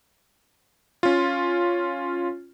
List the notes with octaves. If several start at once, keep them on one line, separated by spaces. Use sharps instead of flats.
C#4 F4